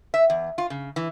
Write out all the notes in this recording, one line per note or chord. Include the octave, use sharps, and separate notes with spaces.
E5
E2
F4
C#3
E3